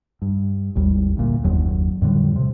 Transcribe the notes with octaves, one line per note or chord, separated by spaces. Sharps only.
G2
G#1 D#2 G3
D2 A#2
F#1 D#2 F#3
F2 A2 D3 G3
C3